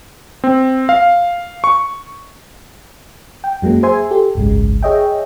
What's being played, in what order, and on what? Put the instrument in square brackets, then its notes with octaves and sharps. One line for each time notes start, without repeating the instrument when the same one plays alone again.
[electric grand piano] C4
F5
C#6
[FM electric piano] G5
F#2 F#3 G#3 A#3
G#4 C5 E5 G#5 C6
G4 A4
G#1 C#2 F#2 G#3
G#4 C#5 D#5 E5 G5